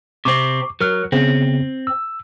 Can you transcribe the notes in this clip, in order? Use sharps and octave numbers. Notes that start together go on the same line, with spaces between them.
C3 C4 C#6 D6
F#3 A#4 F6
C#3 B3 C4
E6